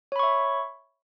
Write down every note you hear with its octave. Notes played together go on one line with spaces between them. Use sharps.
C#5 E5 B5 C#6